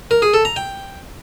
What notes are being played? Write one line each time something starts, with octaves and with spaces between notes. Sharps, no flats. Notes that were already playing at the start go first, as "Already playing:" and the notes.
A#4
G#4
A4
A#5
G5